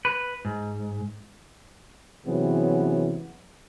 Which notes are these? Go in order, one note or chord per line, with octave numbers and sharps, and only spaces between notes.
B4
G#2
C3 E3 F#3 G#3 B3 C#4